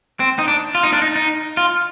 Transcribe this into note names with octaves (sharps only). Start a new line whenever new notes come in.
C4
D#4
D4
F4
D#4
D4
D#4
D#4
F4